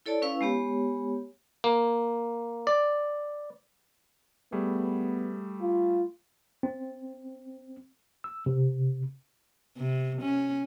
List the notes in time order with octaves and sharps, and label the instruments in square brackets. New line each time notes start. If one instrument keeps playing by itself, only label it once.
[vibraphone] E4 A4 C#5 D5 A5
C#4 E4 B4 F5 E6
G#3 B3 G4 C#5
[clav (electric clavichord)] A#3
D5
[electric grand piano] G3 A3 G#4 [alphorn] B3
[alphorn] F4
[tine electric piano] C4
E6
C3
[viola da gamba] C3
C#4